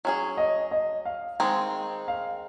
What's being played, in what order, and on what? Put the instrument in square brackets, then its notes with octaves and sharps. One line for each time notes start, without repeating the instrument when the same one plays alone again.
[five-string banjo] F#3 C#4 G#4
[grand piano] D#5
D#5
F5
[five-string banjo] D#3 G#3 C4
[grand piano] F5